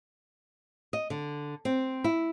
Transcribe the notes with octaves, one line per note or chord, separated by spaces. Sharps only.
D#5
D3
C4
E4